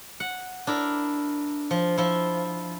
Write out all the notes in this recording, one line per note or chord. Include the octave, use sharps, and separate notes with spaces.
F#5
D4 E4 A#4
F3
F3 E4